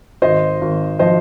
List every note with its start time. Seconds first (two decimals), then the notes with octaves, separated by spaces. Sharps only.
0.22 G#1 C5 D#5
0.61 G#1
0.99 F3 C5 D#5